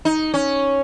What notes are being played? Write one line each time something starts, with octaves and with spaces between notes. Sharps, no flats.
D#4
C#4